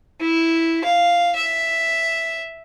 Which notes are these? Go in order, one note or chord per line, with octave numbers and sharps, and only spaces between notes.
E4
F5
E5